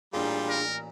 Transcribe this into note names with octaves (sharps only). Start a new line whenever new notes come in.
A1 A#2 G3 D4 F4 G#4
A#4